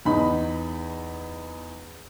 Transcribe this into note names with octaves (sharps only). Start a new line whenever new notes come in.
E2 D#4 B5